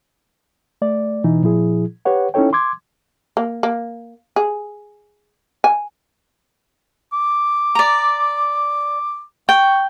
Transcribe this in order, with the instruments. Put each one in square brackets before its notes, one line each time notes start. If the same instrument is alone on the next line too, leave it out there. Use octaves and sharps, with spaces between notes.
[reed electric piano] A3 D5
B2 E3 D#4
A#2 F3 E4 G#4
G4 B4 C#5 F#5
C#4 D#4 E4 A4 C#5 G5
C6 D6 G#6
[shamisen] A#3
A#3
G#4
G#5
[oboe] D6
[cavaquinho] D5 A#5
[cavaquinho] G5 [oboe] C#6